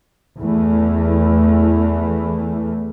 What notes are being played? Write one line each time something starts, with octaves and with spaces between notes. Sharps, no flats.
E2 E3 A3